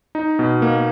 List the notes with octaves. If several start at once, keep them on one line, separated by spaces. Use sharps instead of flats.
D#4
B2
A#3